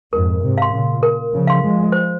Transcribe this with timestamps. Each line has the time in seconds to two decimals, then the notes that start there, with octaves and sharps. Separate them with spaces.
0.12 F2 G#2 A#4
0.42 G#2 C3
0.58 F5 C6
0.73 A#2 C#3
1.03 A#4
1.33 C#3 F3
1.47 F5 C6
1.63 F3 G#3
1.92 C5